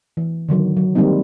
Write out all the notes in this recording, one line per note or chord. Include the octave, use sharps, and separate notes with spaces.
E3
D3 D#3 F#3
F#3
D#3 G3 G#3 A#3 C4 D#4